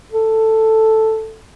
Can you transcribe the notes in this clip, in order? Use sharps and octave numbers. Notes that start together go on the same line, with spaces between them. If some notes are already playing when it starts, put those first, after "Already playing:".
A4